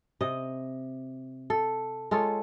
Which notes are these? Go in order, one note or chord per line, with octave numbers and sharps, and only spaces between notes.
C3 D#5
A4
G#3 F4 A4 C#5